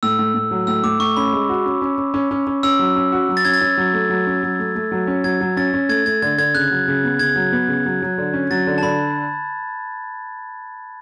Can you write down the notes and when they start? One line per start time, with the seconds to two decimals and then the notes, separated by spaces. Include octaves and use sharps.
0.03 A2 E6
0.19 A2
0.34 A2
0.51 F#3
0.67 A2 E6
0.84 A2 D6
1.00 A2 C#6
1.17 C#4 B5
1.33 G#3
1.49 F#4
1.65 C#4
1.82 C#4
1.98 C#4
2.14 C#4
2.31 C#4
2.47 C#4
2.63 C#4 E6
2.79 F#3
2.96 C#4
3.12 F#4
3.29 F#3
3.37 A6
3.45 C#4 G#6
3.53 A6
3.61 C#4
3.78 F#3
3.93 A3
4.10 F#3
4.26 C#4
4.43 F#3
4.59 A3
4.75 A3
4.92 F#3
5.07 C#4
5.24 F#3 G#6
5.41 F#3
5.57 C#4 A6
5.74 C#4
5.89 A3 G#6
6.06 A3 G#6
6.22 D3 G#6
6.38 D3 G#6
6.55 C#3 F#6
6.71 F#3
6.88 C#3
7.04 B3
7.19 C#3 G#6
7.36 F#3
7.52 B3
7.68 C#3
7.86 F#3
8.02 F#3
8.18 D3
8.34 C#4
8.51 F#3 A6
8.67 D3
8.78 A5
8.83 D3 B5